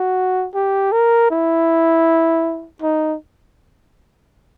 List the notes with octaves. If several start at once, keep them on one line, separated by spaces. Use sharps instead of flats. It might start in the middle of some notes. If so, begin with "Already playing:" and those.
Already playing: F#4
G4
A#4
E4
D#4